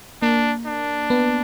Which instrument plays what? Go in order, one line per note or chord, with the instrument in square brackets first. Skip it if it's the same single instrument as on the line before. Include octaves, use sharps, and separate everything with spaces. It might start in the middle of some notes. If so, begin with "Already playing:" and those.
[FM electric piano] A#3 [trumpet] D4
[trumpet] D4
[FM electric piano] B3